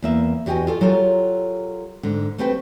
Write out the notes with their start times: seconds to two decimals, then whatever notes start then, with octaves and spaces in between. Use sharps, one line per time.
0.02 E2 A#3 E5
0.46 E2 F#4 G4 D#5 G5 G#5
0.67 F4 A4 D5
0.81 F#3 F4 G4 A4 A#4
2.03 G#2 D3
2.38 A3 C4 G4 B4 G5